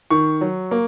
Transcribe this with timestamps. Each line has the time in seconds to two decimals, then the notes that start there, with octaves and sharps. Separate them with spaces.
0.10 D#3 C#6
0.41 F#3
0.71 A#3